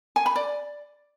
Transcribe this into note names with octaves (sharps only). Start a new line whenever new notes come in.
G#5
B5
D5